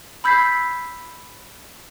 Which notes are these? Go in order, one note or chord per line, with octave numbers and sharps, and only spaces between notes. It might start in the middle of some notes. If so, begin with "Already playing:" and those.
B5 E6 G6 G#6 B6 C7